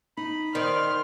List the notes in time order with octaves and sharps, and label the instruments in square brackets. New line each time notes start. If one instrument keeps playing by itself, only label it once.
[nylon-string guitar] D#4 [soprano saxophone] B5
[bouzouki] D#3 [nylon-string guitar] A#4 C5 D5 [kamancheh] C6 F6